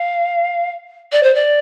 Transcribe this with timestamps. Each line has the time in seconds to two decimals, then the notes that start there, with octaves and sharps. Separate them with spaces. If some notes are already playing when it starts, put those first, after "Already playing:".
Already playing: F5
1.12 D5
1.23 C5
1.34 D5